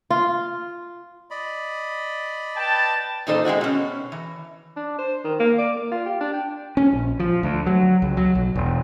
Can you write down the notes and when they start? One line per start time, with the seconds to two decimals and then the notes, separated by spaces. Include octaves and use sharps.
0.10 F4
1.31 D5 D#5 B5
2.57 B4 G5 A5
3.27 A#2 E3 D#4 A4 C5 D#5
3.45 G#3 C4 E4 F#4
3.61 B2 C#4
4.12 E3
4.77 D4
4.99 C5
5.24 D#3
5.40 A#3
5.58 D5
5.76 A#3
5.92 F4
6.06 G4
6.21 D4
6.34 G5
6.77 C#4
6.92 A#1
7.20 F3
7.43 D2
7.66 F#3
8.02 C#2
8.17 F#3
8.35 B1
8.56 E1